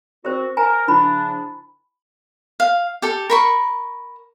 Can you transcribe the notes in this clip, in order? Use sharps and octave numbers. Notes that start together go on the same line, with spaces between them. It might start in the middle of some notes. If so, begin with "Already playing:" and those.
C4 F#4 A#4 C5
A#4 G#5 A#5
C#3 F3 D4 E4 B5
F5
G4 A4
A#4 B5 C#6